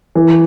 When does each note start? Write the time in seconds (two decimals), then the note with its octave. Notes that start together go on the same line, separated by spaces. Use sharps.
0.15 E3